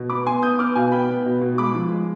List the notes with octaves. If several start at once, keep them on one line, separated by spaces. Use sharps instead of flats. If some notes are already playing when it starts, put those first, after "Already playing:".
Already playing: B2
B3 B5 D6
B3 G#5 C6
B3 D#6 G6
B3 D6 F6
B2 F5 G#5
B3 G5 B5
B3
B2
B2
G#3 B5 D6
F3
G#3